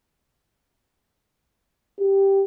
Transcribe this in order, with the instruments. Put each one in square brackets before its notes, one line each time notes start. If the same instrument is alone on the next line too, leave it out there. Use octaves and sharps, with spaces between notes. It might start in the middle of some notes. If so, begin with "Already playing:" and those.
[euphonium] G4